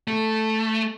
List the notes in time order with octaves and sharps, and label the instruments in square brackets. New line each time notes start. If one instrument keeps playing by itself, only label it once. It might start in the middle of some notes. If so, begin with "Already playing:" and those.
[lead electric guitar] A3